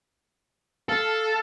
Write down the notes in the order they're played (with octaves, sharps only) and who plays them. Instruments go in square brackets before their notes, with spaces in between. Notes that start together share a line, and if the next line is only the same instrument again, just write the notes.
[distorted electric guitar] A4 [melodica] F5 A5